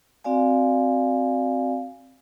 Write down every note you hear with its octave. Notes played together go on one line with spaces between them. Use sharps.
C4 F#4 D5 F5 G#5